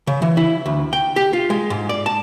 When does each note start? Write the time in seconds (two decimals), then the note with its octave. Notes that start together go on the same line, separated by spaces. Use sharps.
0.07 C#3
0.22 E3
0.37 E4
0.66 D2
0.93 G5
1.16 G4
1.33 F4
1.50 G#3
1.70 G#2
1.89 D5
2.06 A5